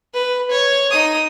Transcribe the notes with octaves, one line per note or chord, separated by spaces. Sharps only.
B4
C#5
D#4 D#6